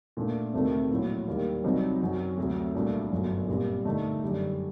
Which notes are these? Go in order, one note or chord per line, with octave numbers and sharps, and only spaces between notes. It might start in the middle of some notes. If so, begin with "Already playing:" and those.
A#2 A3 D4
D2 C3 D#3 A3 C4
A#1 A2 F#3
D#2 D#3 G3
C2 C3 F#3 C4 D#4
F#2 F#3 C4 F#4
D2 C3 F#3
C2 A#2 A3 D4
G1 F#2 F#3
A#2 G3 C4
D3 A3 D#4
F#2 D3 G3